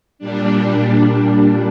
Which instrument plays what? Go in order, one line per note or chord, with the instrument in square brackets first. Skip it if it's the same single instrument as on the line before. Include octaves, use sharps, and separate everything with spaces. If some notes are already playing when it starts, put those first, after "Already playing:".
[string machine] A#2 G3 D4